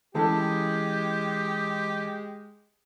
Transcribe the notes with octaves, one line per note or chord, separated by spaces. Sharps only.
E3 G#3 C#4 G4 A4 G5